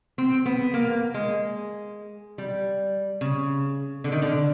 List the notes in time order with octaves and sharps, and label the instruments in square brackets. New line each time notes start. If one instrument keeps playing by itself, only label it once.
[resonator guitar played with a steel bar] C4
B3
A#3
G#3
G3
C#3
D3
D#3
D3